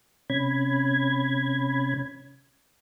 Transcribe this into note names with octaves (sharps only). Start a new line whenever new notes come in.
C3 C#4 B5 G#6